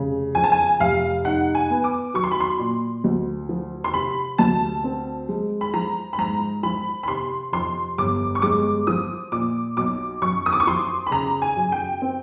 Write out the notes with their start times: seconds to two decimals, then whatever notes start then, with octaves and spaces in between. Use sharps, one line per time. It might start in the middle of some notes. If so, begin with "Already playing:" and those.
Already playing: F1 C#3
0.35 F2 G#5
0.44 A5
0.52 G#5
0.80 F1 F5
1.25 D#4 F#5
1.55 G#5
1.70 B3
1.84 D6
2.14 F#3 C#6
2.24 C6
2.31 B5
2.40 C6
2.59 A#2
3.04 D2
3.49 F3
3.84 C6
3.94 C3 B5
4.38 D2 A5
4.84 C4
5.29 G#3
5.61 B5
5.74 F3 A#5
6.13 B5
6.18 G#2 A#5
6.63 F3 B5
7.03 B5
7.08 C3 C6
7.52 F2 C6
7.98 G1 D6
8.35 C#6
8.42 G#3 D6
8.87 F3 D#6
9.32 A#2 D6
9.77 B1 D6
10.22 F#2 C#6
10.46 D#6
10.53 D6
10.60 C#6
10.67 F3 C6
11.07 B5
11.11 C#3 A#5
11.42 G#5
11.56 F#2
11.72 G5
12.02 C4